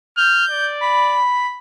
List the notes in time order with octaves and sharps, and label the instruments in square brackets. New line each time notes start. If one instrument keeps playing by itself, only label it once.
[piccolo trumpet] F6 [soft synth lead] G6
[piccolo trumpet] D5
[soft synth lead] B5